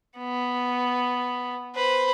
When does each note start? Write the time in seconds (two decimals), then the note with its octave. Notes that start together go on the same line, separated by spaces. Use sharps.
0.17 B3
1.75 B4 C5